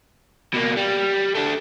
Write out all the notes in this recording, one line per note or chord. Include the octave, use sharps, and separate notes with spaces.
B2 A#3
G3
A3 D4